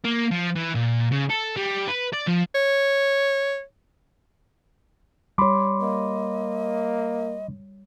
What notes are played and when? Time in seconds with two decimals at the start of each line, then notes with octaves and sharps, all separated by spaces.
0.05 A#3
0.31 F3
0.56 E3
0.75 A#2
1.12 C#3
1.30 A4
1.56 G3
1.88 B4
2.13 D5
2.27 F3
2.55 C#5
5.38 G3 C#5 B5 C6 D6
5.81 A#3 D#5